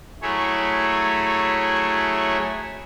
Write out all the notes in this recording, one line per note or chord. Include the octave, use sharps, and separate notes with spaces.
F#3 A3 E4 G#4 C#5